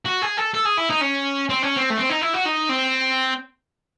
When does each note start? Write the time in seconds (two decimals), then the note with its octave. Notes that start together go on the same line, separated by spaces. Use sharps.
0.06 F#4
0.23 G#4
0.38 A4
0.54 A4
0.66 G#4
0.78 E4
0.90 D#4
1.01 C#4
1.50 C4
1.63 C#4
1.76 C4
1.90 A3
1.97 C4
2.09 D#4
2.21 E4
2.33 F#4
2.45 D#4
2.69 C4